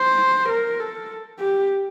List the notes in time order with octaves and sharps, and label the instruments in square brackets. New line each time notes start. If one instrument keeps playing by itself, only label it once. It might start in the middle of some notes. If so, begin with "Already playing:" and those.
Already playing: [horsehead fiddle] C5
A#4
A4
G4